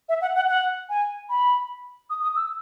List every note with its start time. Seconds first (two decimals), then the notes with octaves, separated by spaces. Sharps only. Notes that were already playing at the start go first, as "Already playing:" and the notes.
0.09 E5
0.21 F#5
0.36 F#5
0.49 F#5
0.89 G#5
1.29 B5
2.10 D#6
2.23 D#6
2.36 E6